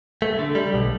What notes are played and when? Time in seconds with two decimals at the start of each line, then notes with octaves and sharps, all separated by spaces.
0.22 A3
0.39 D3
0.55 G3
0.74 B1